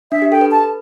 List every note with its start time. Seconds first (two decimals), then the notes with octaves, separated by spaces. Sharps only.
0.11 D4 E5
0.22 G4
0.31 A4 G5
0.41 B4
0.51 A5